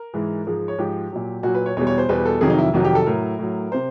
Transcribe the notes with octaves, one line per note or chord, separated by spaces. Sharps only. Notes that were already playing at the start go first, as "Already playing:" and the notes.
Already playing: A#4
G#2 E3 G#3
G#2 F3 G#3
C#5
G#2 F3 G#3 G4
A#2 F#3
A#2 F#3 F#4
B4
C#5
E2 B2 G3 C#5
C#5
C5
E2 B2 G3 B4
A4
F2 C3 D#3 F#3 G#4
D#4
E4
F2 C3 D#3 F#3 F#4
G4
A4
A2 F#3 A#4
A2 F#3
C3 C5